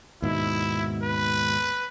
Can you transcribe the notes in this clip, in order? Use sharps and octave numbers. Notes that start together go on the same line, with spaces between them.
D#2 G#2 B2 E4
B4